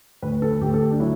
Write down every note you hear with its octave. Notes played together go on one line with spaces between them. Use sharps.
D2 B4
A4
D2 G4
A4
G4
D4
F#3 E4